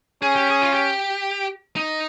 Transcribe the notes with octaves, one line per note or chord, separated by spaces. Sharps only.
C#4 G#4
G4
G#4
F4
G4
D#4